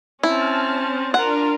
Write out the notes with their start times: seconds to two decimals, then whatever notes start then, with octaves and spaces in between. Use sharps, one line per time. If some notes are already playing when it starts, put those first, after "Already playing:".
0.23 C4 C#4 E4 A5 F6
1.14 D4 F4 A#4 F#5